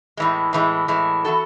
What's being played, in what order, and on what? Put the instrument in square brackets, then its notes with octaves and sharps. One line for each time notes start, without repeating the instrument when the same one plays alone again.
[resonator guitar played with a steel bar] A2 E3 G#3
A2 E3 G#3
A2 E3 G#3
E3 B3 F#4 A4